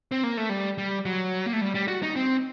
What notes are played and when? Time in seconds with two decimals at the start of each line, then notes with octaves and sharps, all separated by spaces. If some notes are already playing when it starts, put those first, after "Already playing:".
0.12 C4
0.24 A#3
0.37 A3
0.49 G3
0.78 G3
1.05 F#3
1.46 A#3
1.53 A3
1.61 G3
1.75 G3
1.88 F#4
2.03 D#4
2.16 C4